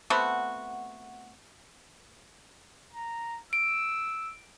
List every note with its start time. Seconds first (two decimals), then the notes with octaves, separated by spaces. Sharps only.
0.10 A3 B3 C4 F#4
2.93 A#5
3.53 E6 D7